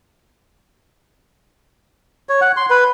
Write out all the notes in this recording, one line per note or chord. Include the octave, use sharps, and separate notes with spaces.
C#5
F#5
C6
B4